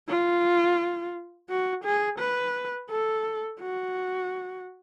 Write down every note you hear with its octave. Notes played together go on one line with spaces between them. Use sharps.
F4
F#4
G#4
B4
A4
F#4